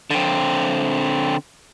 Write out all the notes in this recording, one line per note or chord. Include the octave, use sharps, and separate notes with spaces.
D3 C4